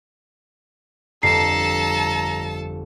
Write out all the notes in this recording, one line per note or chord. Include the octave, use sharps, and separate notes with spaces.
G1 F2 A4 A5 A#5 C7